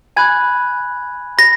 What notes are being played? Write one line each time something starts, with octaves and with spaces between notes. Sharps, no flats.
G#5 B5 F#6 G#6
B5 A#6